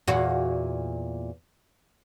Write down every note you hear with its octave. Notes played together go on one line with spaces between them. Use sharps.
E2 A#2 F#4